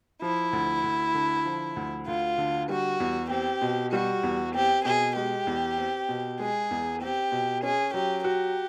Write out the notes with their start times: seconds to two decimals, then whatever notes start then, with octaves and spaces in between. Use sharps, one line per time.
0.22 F3 E4
0.53 D2
0.84 D2
1.15 D3
1.46 F3
1.76 D2
2.07 D2 F4
2.38 D3
2.69 G3 F#4
3.00 E2
3.30 C4 G4
3.62 B2
3.92 G3 F#4
4.23 E2
4.54 C4 G4
4.85 B2 G#4
5.16 G#3 G4
5.47 E2
5.78 C4
6.09 B2
6.40 G#3 G#4
6.71 E2
7.01 C4 G4
7.32 B2
7.63 C#4 G#4
7.93 F#3 G4
8.24 F#4 G4